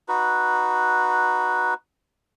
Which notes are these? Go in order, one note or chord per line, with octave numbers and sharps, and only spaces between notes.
D#4 F#4 B4